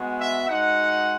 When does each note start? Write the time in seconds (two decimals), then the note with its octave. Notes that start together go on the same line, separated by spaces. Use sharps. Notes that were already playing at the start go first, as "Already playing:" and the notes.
Already playing: G#3 B3 F#4
0.20 E5
0.48 G#3 D#4 F#4 F#5